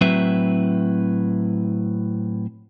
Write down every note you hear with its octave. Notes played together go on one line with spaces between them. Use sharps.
A2 F#3 C4 E4 B4 E5